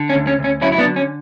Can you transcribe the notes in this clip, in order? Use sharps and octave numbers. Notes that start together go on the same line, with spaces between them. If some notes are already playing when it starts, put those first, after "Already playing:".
Already playing: D3
C#4
D2
C#4
D2
C#4
F#3 C#4 E4
E4
B3 D4
D3
C#4